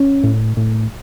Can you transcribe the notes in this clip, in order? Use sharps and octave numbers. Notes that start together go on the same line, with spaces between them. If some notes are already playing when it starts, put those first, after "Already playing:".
Already playing: C#4
A2
A2